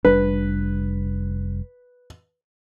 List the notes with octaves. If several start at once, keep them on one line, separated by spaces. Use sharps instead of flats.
F1 G3 D4 B4